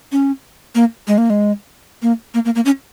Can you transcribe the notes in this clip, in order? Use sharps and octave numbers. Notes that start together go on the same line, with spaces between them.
C#4
A#3
G#3
A#3
G#3
A#3
A#3
A#3
A#3
C#4